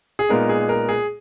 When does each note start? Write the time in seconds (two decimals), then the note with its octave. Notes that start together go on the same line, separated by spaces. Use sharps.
0.19 G#4
0.29 A#2 G#3 B3 D#4 A#4
0.49 G#4
0.69 A#4
0.89 G#4